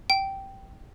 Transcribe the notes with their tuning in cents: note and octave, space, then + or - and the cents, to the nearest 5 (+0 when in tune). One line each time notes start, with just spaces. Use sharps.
G5 -10